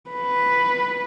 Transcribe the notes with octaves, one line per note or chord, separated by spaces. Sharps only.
B4